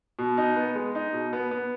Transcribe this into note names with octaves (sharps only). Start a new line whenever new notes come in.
B2
D#4
B3
G#3
D#4
B2
B3
B3